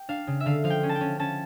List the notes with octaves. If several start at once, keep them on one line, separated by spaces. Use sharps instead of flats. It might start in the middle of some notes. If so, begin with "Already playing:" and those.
Already playing: G5
D4 F5
C#3
E5
D3 F5
F3 F5
G5
C#4
A5
G5
C#4
C#4 A5